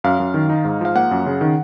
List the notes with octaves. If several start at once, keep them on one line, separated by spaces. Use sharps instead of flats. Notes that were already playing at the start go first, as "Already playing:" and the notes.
F#2 F5
F#2
D#3
D#4
G#2
F3 F5
A#3 F#5
F#2
C#3
D#3